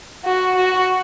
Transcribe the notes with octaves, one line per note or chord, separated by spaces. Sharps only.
F#4
F#4